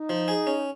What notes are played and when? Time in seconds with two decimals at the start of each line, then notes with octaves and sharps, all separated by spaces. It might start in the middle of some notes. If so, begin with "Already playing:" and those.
Already playing: D#4
0.09 F3
0.28 G#4
0.47 C#4